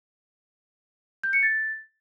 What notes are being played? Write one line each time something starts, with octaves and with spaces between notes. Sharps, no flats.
G6
C#7
A6